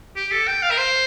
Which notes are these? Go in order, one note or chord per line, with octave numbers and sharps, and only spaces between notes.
G4
A4
G5
F5
A#4
C5